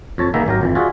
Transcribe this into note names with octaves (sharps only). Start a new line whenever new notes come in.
F2 C#5 A5
D#3 A#3 B3 D#4 G#4 E5
G#1 F#3 G4 A#4
G#1 F2 E3
F4 F#4 G#4 D5 E5 F#5